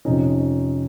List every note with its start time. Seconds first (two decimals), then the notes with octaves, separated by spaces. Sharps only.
0.05 F2 C3 F3 C#4 D#4